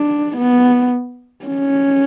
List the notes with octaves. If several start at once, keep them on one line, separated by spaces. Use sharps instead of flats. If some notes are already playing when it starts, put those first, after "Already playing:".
Already playing: D4
B3
C#4